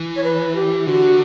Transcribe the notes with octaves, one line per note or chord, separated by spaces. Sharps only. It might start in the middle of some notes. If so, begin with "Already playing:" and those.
Already playing: E3
C#5
B4
G4
D3 F#4